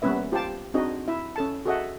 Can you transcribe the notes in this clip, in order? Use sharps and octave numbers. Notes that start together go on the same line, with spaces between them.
G3 A#3 B3 C#4 B4 E5
F4 G4 C5 G5 A5
C4 D4 D#4 F#4 G#4 D#5
E4 E5
C#4 A4 A5
F#4 G#4 A4 D#5 E5 F#5